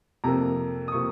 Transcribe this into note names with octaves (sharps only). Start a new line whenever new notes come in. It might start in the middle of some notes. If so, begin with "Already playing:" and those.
F2 C3 F3 A#3 A#5
D#6
C3 F3 A#3 C#6